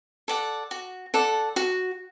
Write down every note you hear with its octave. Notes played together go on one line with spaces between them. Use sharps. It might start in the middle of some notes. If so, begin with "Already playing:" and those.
A4 D5 F#5
F#4
A4 D5 F#5
F#4